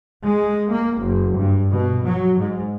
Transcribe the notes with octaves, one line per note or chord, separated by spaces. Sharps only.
G#3
A#3
F#1
G2
B2
F#3
G#2